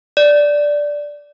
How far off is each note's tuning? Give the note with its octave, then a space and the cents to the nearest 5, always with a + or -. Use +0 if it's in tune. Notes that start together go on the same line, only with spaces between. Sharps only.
D5 -5